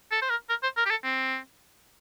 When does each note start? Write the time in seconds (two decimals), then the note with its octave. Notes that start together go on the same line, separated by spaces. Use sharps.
0.11 A4
0.22 C5
0.30 A#4
0.49 A#4
0.63 C5
0.77 A#4
0.86 G4
0.90 A4
1.04 C4